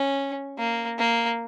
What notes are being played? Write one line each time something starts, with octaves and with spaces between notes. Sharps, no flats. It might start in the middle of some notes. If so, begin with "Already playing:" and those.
Already playing: C#4
A#3
A#3